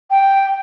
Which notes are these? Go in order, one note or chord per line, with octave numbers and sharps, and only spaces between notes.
G5